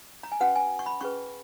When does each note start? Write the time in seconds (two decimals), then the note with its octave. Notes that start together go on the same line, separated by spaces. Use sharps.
0.23 A#5
0.32 G#5
0.40 C#4 F#4 B4 F#5
0.56 G#5
0.79 C#6
0.86 B5
1.01 C#4 G#4 B4 C#6